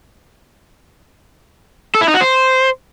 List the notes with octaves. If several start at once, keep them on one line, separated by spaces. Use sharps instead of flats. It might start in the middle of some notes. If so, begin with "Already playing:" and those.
A4
E4
D#4
F#4
C5